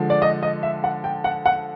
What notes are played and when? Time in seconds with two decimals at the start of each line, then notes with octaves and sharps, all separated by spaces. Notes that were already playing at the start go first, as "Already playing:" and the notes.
Already playing: D3 F3 G#3
0.10 D5
0.22 D#5
0.43 D#5
0.63 E5
0.84 F#5
1.04 G5
1.24 F#5
1.46 F#5